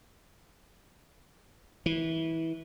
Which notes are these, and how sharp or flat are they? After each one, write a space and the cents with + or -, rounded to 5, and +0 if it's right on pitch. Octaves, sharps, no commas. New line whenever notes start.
E3 -20